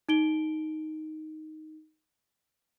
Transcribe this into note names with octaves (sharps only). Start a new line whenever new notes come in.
D#4 D7 G7